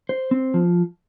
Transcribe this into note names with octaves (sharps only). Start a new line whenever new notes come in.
C5
C4
F3